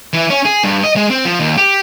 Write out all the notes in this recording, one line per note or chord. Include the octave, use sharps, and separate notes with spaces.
E3
C#4
G#4
G2
D#5
G#3
C4
F3
D#2
G4